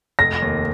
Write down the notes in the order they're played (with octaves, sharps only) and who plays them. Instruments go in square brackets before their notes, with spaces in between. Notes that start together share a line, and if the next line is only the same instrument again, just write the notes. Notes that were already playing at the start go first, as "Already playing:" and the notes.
[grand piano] F1 [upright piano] A#6
[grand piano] D#2